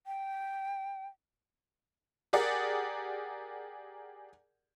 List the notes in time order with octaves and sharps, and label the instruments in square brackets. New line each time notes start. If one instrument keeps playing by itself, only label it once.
[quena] G5
[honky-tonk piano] G4 G#4 A#4 D5 F#5